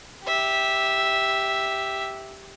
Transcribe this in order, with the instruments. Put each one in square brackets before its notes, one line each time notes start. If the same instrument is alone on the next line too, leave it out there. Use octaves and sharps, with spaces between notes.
[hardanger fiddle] G4 E5